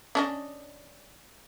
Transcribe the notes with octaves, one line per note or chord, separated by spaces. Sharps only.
C#4 D4 D#5